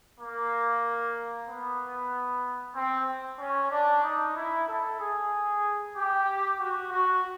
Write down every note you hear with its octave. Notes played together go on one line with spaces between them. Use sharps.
A#3
B3
C4
C#4
D4
D#4
E4
A4
G#4
G4
F#4
F#4